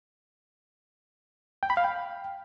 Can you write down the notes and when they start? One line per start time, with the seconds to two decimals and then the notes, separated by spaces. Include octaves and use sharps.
1.63 G5
1.70 B5
1.77 F5
1.84 G5